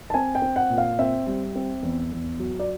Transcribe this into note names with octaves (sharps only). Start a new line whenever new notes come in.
A5
C4 G#5
G5
C4
F#5
A#2
F5
C4 E5
G3
C4
E2
E2
F#3
D5